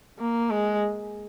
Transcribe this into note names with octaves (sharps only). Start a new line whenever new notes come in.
A#3
G#3